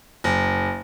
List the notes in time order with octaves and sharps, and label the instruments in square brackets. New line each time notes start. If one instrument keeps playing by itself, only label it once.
[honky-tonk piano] F#1